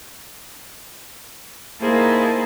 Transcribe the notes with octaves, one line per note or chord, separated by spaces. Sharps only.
A#3 D#4 E4 G#4 C5 A5